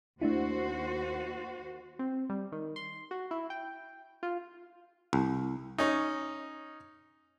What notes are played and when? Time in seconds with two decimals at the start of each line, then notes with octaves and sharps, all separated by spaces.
0.22 D#2 A3 D4 E4 F#4 C5
1.99 C4
2.30 G3
2.52 D#3
2.76 C6
3.11 F#4
3.31 E4
3.50 G5
4.23 F4
5.13 C2
5.78 C#4 D#4